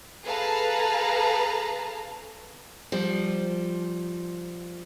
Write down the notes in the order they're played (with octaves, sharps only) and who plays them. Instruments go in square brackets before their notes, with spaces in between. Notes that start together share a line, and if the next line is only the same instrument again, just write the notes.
[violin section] G#4 A4 B4 F5 A5 A#5
[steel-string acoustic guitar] F3 G3